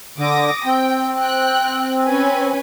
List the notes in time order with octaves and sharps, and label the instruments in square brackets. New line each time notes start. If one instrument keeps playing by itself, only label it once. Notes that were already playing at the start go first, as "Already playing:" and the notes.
[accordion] D3 [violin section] D6 D#6 A#6
[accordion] C4 [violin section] G5
[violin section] G5 F#6
C#4 B4 G#5